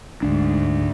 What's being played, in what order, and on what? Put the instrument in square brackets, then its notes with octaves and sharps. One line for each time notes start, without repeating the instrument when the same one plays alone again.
[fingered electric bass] D2 D4 [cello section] G#2